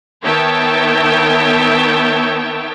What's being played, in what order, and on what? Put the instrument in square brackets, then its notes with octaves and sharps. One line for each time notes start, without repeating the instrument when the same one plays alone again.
[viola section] D#3 B3 C#5 E5 G5 A5